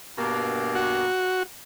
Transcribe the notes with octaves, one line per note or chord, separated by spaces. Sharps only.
G2 B2 A#3
F#4